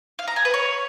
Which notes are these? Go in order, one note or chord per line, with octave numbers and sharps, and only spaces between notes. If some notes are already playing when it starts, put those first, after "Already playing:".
F5
A#5
G#5
B4
C#5